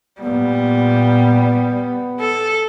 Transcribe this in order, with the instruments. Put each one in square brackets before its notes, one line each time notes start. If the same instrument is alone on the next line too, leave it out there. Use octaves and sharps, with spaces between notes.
[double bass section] A#2 [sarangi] G3 [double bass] B3
[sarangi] A4